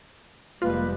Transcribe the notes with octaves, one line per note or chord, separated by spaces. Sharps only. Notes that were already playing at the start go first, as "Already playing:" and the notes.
F1 G3 G#3 A#3 F4 B4